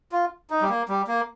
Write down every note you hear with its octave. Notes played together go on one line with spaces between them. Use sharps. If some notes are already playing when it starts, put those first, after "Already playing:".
F4
D#4
G3
A#3
G3
A#3